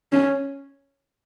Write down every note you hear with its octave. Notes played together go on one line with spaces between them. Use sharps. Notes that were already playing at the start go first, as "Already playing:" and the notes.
C#4